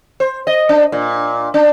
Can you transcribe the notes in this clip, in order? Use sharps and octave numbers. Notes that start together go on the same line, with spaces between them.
C5
D#5
D4
A#2
D4